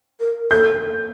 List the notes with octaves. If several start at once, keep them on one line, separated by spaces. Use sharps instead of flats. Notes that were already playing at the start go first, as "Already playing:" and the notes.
A#4
A4 G6